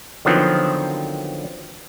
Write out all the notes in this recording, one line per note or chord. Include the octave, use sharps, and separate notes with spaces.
D3 D#3 F3 F#3 B3 C4